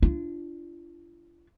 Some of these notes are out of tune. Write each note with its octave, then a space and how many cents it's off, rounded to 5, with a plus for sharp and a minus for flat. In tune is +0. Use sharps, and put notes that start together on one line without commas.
D4 +0 F4 -35